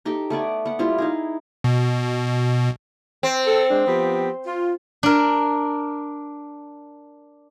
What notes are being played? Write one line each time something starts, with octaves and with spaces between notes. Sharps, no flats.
D#4 G4 A4 G5
A3 B3 D5 G#5
B3 F#5
G3 E4 F4 F5
D#4 E4 G#4
B2
C4
A4
G#3 D4
F3 B3 G4
F4
D4 A#4